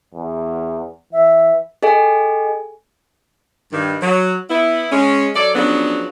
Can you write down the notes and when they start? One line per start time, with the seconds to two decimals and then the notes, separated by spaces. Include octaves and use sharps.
0.14 E2
1.13 E3 E5
1.83 G#4 A4 D#5 G5 G#5
3.72 G2 D#3
4.02 F#3
4.50 B3 E4
4.92 G#3 C#4
5.36 F#3 A4 D5
5.55 C#3 F3 F#3 B3 D4